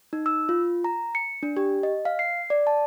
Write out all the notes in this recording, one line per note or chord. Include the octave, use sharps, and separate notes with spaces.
D#4
E6
F4
A#5
C#7
D4
G4
D#5
F5
C7
D5
A5